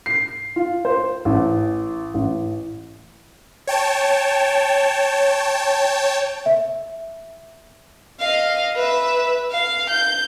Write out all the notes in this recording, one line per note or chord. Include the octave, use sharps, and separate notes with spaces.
C7
F4
C5
A1
A1
C#5 G5 A5
E5
D#5 F5
B4 E5
F5
G6